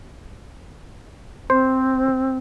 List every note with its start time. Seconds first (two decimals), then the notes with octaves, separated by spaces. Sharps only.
1.50 C4 C5